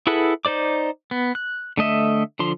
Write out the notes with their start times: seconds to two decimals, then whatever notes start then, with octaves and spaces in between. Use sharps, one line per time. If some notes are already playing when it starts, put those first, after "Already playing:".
0.07 E4 G#4 A4 B4 F#5
0.45 D#4 C5 D5 D6
1.11 B3
1.35 F#6
1.77 D3 A3 D#5 E5
2.39 D3 F3 C6